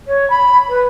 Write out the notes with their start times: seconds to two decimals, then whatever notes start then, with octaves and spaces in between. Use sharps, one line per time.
0.08 C#5
0.30 B5
0.69 B4